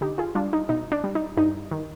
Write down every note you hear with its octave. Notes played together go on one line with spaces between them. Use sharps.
D3 D#4 G4
F4 G#4
G3 D4 F4
D#4
B2 D#4
D4
G3
D#4
G2 D#4
D#3